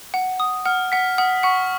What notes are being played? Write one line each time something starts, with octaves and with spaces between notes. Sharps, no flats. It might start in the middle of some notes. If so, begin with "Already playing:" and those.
F#5
D#6
F#5 F6
F#5 B6
F#5 D#6
F#5 C#6